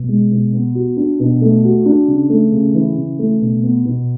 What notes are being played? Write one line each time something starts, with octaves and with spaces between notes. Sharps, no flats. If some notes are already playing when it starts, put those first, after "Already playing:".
Already playing: B2
G#3
B2
B3
F#4
D4
B2
A3
F#4
D4
C#3
A3
C#3
E3
C#3
A3
B2
B3
B2